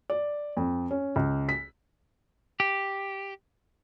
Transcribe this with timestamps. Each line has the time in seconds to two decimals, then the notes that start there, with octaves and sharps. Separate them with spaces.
0.10 D5
0.57 F2
0.91 C#4
1.16 C#2
1.49 B6
2.60 G4